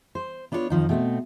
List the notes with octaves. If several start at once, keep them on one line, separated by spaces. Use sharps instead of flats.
C5
B3 D4 F4 A4 C#5
F2 D#3 F3 D#4
B2 A3 B3 C4